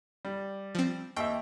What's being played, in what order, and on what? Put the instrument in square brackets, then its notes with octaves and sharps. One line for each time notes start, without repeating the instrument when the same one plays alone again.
[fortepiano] G3
[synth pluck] F3 C4
[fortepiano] D#2 E5 [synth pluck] G5